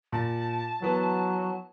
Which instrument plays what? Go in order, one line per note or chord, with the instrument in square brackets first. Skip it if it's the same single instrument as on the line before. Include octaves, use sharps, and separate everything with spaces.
[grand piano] A#2 [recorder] A5
[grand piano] E3 B3 [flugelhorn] F#3